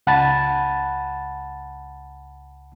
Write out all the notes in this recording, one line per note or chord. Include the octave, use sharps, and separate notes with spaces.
C#2 F#5 A5 B5 A6